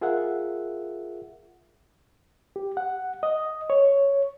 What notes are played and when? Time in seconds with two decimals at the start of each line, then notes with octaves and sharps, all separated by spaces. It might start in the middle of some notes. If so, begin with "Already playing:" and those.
0.01 F4 G#4 A#4 E5 F#5
2.56 G4
2.77 F#5
3.23 D#5
3.70 C#5